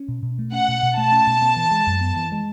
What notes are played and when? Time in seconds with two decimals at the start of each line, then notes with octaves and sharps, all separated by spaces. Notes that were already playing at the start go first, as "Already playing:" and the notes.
Already playing: C#4
0.08 B2
0.23 B2
0.39 A3
0.52 C#4 F#5
0.68 B2
0.83 B2
0.97 A3 A5
1.12 C#4
1.27 B2
1.42 B3
1.56 E3
1.71 G#3
1.87 F#2
2.01 B3
2.16 E3
2.32 G#3